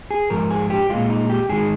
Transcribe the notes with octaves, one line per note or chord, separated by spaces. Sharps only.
G#4
G#2 F3 A#4
G#4
G4
A#2 G#3 F4
D#4
G4
G#2 D#3 G#3 G#4